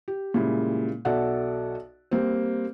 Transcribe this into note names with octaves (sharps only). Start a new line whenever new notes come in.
G4
A#2 C#3 G3 G#3 E4
B1 F#4 A4 D5 E5 F#5
G3 A#3 C4